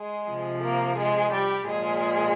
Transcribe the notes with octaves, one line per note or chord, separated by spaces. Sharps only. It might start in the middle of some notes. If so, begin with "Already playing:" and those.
Already playing: G#3 G#4
C3 F3
A#3 A#4
G#3 G#4
G3 G4
A#2 F3 G#3 G#4